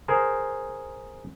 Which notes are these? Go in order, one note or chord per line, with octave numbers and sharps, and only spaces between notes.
G#4 A#4 C5